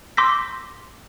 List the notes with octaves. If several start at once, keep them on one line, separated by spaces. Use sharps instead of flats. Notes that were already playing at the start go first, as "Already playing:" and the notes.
C6 D6 E6 G6 A#6 B6